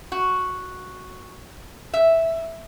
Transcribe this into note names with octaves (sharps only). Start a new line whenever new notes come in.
F#4
E5